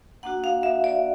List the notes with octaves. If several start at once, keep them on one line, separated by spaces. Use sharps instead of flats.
A#3 D4 F#4 F#5
F5
E5
D5